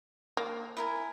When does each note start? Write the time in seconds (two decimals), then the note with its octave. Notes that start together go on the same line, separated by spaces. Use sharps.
0.37 A#3
0.77 E4 A#4 G#5